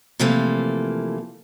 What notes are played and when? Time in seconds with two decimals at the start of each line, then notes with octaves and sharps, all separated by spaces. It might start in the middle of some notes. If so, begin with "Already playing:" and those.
0.20 C3 E3 F3 A3 A#3